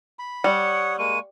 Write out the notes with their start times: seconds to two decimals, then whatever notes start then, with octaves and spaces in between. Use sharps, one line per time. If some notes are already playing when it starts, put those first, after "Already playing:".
0.19 B5
0.44 G3 C#5 F#5 D#6 C#7
0.99 G#3 A#3 C#6 D#7